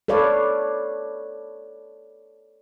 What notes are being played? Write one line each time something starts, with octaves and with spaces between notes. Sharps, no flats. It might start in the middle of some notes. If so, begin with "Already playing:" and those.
A4 B4 C#5 D5 F5